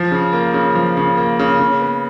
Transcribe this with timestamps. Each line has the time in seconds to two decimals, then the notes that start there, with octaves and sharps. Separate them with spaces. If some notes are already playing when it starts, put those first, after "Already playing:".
Already playing: F3
0.12 C#3
0.33 A#3
0.54 C#3
0.75 F3
0.97 C#3
1.17 A#3
1.39 C#3
1.60 C#3
1.81 B3